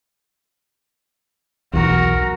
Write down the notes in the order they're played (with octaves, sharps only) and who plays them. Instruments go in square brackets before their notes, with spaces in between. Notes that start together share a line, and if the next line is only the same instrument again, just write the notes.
[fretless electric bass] B1 E2 [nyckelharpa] F#4 A#4